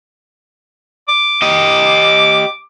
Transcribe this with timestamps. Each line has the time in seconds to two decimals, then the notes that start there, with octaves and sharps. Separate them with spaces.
1.09 D6
1.42 G4 D#5